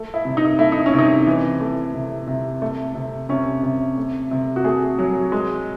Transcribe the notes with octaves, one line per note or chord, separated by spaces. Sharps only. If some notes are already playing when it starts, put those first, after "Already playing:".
Already playing: A3
E4
C3
D#4
A3 E4
D#4
C#4
C3
D#4
E3
A3
C3
C3
A3
C3
C3 C#4
C3
A3
C3
F#4
A3 G#4
F#3
G#3